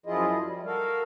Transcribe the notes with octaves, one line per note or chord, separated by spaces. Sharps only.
F#2 F3 E4 F4 G#4 D#5
G3
F#4 A4 A#4 F5